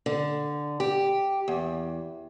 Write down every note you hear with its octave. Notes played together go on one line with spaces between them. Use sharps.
D3
G4
E2